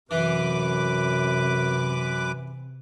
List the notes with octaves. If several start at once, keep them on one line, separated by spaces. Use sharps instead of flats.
F#2 C3 E3 B4 D6